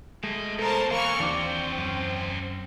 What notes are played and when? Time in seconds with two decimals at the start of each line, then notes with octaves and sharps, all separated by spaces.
0.24 G#3 A3 D#5 A5
0.59 B2 A4 A#4 C5 A5
0.91 E3 A#3 F5 C#6 F6
1.20 D#2 E3 C4 D4 F#4 C5 D6
1.78 F#2 C#4